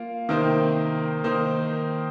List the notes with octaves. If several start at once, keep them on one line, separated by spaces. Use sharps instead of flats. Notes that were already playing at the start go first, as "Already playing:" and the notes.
Already playing: A#3 F4
C3 D#3 A#3 D#4 C5
D#3 A#3 D#4 C5